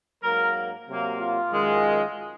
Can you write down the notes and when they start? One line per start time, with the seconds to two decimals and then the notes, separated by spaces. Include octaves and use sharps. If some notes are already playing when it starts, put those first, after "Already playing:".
0.23 G#2 F#3 A#3 A#4
0.88 C3 F#3 A#3
1.19 F4
1.51 F#2 D#3 G#3